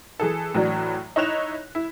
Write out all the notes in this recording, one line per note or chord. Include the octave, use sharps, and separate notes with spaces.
E3 G#4 A4
A2 E3 F#3 D4
D#4 E4 C#5 F#6 E7 F7
E4